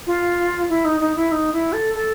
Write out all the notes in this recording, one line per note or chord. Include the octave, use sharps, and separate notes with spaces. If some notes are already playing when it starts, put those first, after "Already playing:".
F4
E4
D#4
D#4
E4
D#4
E4
A4
A4